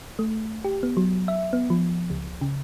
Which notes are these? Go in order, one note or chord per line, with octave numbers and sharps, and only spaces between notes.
A3
G4
B3
F#3
E5
B3
F3
C#2
C#3